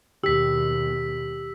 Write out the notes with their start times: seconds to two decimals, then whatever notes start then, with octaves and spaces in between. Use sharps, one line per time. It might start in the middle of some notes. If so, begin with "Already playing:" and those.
0.24 D#2 B2 G4 E6 B6